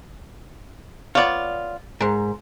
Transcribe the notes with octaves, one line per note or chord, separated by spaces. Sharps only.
B3 F4 C#5 D5
G#2 A#4 C5